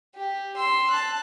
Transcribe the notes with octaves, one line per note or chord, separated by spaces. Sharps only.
G4
C6 E6
A5 F#6